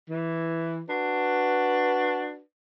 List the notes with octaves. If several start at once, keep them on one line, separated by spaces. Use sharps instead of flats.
E3
D4 F#4 B4